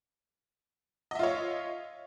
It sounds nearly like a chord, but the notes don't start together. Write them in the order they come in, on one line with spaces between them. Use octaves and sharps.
D#5 E5 F4 C#5